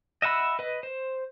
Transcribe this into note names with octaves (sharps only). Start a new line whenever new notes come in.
D#5 E5 F#5 B5 E6
B4 D#5
C5